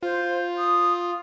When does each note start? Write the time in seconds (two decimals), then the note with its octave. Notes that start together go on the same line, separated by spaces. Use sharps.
0.03 F4 C5
0.58 D#6